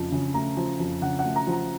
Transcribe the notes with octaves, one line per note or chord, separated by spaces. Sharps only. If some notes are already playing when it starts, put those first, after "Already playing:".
Already playing: F2 C#3 F3
C#3
A3 A#5
F3
F2
C#3 F#5
F#5
A3
A#5
F3
A#5